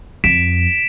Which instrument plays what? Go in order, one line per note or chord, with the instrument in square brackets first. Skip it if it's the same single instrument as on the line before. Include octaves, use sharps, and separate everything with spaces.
[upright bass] F2 [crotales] B6 D7 E7